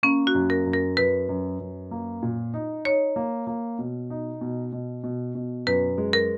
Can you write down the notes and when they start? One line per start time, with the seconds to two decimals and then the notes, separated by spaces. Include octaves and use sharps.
0.03 A#3 C#4
0.27 F#4
0.34 F#2
0.50 A#4
0.66 F#2
0.74 A#4
0.97 F#2 B4
1.29 F#2
1.60 F#2
1.91 A#3
2.22 A#2
2.54 D#4
2.85 D#4 C#5
3.16 A#3
3.47 A#3
3.79 B2
4.10 D#4
4.41 B2
4.73 B2
5.04 B2
5.35 B2
5.67 F#2 B4
5.98 G#3
6.13 A#4